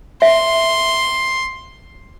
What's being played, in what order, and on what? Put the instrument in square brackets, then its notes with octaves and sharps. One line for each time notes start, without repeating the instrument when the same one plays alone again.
[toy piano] E5 [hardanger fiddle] C6